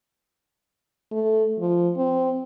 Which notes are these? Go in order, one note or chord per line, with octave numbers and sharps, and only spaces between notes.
A3
F3
C4